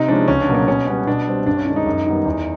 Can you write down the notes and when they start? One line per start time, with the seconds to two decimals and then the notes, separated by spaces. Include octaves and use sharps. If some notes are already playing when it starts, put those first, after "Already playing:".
Already playing: C3 D#4
0.08 F3 G#3 C#4 D4
0.28 C#2 C#4
0.41 D4
0.48 B2 F#3 A#3
0.55 C#4
0.68 B2 C#4
0.87 G3 B3 C#4
1.07 B2 D4
1.27 G3 C4
1.46 G2 D4
1.57 C#4
1.66 D#3 G#3 D4
1.76 D#4
1.86 F#2
2.06 D#3 G3 B3
2.25 E2